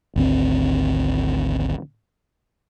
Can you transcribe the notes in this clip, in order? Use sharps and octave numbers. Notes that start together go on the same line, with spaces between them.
G#1 D2 C4